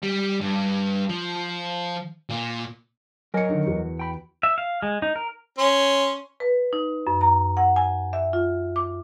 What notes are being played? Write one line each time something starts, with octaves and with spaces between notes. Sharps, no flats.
G3
G2
F3
A#2
F#3 A#4 D#5 G#5 C#7
D3 D#3
E2 F#4
G5 B5
E5
F5
G#3
D#4
A#4
C#4 C6
B4
D#4
F#2
A#5
F#5
G#5
E5
F4
D6